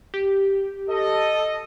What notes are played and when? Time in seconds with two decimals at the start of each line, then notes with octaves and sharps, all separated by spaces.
0.14 G4
0.90 A4 D#5